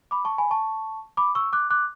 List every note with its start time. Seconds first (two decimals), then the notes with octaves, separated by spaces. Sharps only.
0.11 B5 D6
0.25 A5 C#6
0.38 G#5 B5
0.51 A5 C#6
1.17 B5 D6
1.35 C#6 E6
1.53 D6 F#6
1.70 D6 F#6